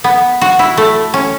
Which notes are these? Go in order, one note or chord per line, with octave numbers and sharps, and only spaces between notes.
B3
F#4
E4
A3
C#4